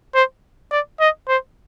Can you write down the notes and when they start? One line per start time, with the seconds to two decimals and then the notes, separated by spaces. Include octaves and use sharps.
0.15 C5
0.71 D5
1.00 D#5
1.28 C5